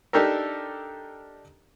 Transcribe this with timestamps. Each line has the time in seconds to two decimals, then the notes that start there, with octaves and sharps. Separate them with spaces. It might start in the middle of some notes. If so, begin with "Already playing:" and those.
0.13 D4 D#4 G4 A4 A#4